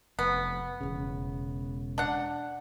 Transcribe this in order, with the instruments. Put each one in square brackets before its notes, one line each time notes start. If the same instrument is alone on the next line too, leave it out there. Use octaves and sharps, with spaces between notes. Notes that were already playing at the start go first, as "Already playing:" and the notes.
[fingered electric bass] F1 [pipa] B3
[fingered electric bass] E1 C#3
[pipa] D4 F#5